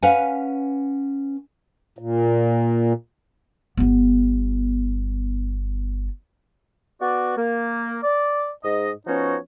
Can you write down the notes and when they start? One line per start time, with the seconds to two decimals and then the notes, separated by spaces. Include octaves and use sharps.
0.02 C#4 B4 F5 F#5 G#5
1.98 A#2
3.77 G1 B3
7.01 B3 F#4 D5
7.37 A#3
8.03 D5
8.64 G#2 D#5
9.07 F3 B3 C#4 D#4 F#4 C#5